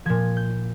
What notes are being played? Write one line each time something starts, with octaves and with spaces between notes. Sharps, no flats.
A#2 F3 G#6
G6